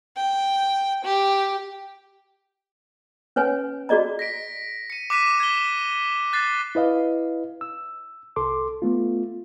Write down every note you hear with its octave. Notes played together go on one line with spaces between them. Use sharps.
G5
G4
C#4 B4 C#5 G#5
F#4 G#4 D5 D#5 A#5
A#6 B6 D7
C#7 D#7
D6 F#6 B6 D#7 E7
G#6 G7
F#6 A6 C7
E4 B4 D#5 F5
E6
C2 A4 C6 D6
A3 B3 F4